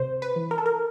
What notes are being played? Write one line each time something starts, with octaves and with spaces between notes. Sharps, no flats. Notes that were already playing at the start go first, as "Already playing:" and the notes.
Already playing: C3 C5
B4
E3
A#4
A4
A#4